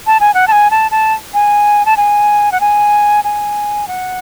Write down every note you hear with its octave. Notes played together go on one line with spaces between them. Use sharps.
A5
G#5
F#5
A5
G#5
A5
A5
G#5
A5
G#5
F#5
G#5
G#5
F#5